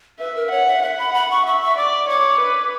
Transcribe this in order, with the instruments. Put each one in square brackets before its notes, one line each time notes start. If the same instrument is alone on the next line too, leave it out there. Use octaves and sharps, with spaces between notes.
[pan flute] B4 [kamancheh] E5
[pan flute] A#4
[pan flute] C#5 [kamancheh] F#5
[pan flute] E5
[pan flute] E5 [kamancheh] F#5
[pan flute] B5
B5
C#6
[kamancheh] E5 [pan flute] C#6
[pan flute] C#6
[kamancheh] D5 [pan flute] D6
[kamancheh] C#5 [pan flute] D6
[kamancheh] B4